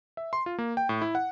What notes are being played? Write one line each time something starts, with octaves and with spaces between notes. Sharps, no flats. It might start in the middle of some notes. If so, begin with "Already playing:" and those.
E5
C6
F4
A#3
G5
A2
E4
F#5